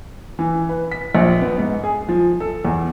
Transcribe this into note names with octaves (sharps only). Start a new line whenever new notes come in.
E3
B4
B6
A#1
B3
G#2
G#4
F3
A4
E2